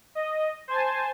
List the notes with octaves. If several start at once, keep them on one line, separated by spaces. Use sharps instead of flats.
D#5
C5 G#5 A5